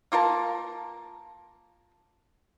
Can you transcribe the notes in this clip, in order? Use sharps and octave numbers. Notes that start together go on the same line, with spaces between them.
A#3 F4 A#4 A5